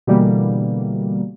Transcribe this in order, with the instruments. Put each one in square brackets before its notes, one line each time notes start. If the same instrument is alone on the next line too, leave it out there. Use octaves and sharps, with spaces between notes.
[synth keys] B2 D3 E3 G3 A#3